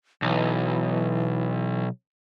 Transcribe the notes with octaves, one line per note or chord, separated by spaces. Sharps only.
B1 E3